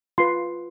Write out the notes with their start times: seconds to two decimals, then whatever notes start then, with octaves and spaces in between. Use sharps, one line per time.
0.18 F4 B4 C6